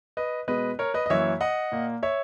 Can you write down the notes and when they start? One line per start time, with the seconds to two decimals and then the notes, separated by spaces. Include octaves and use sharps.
0.17 B4 D#5
0.48 B2 G#3 B3 B4 D#5
0.79 A#4 C#5
0.94 B4 D#5
1.06 D#5
1.10 F#2 E3 A#3 C#5 E5
1.41 D#5 F#5
1.72 A#2 A#3
2.03 C#5 E5